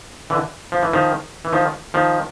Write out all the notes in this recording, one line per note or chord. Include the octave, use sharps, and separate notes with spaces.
D3 E3
F3
E3
D#3 F3
E3
D#3 F3
D#3 F3